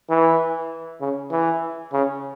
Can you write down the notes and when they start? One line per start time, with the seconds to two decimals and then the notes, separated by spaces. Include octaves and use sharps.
0.10 E3
1.01 C#3
1.31 E3
1.93 C#3